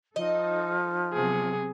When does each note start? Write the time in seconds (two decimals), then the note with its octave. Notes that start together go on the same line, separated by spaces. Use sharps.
0.16 F3 D#4 A4 D#5
1.13 C3 F#3 B3 G#4